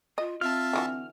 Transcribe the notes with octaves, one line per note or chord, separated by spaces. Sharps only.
F4 D#5
C4 F4 E5 A5 F6
D3 E3 F#4